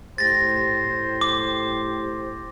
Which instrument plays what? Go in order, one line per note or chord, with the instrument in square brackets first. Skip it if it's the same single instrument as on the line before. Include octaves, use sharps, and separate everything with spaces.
[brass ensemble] A2 G4 C5 [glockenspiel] A6 A#6
[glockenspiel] D6